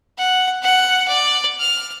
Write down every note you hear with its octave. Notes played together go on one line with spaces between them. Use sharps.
F#5
F#5
D5
F6